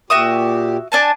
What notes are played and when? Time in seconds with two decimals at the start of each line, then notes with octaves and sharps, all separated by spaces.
0.10 A#2 F#4 G4 E5 D#6
0.92 D4 G#5 A5